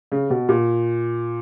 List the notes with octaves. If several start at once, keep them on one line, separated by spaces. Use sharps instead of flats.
C#3
B2
A#2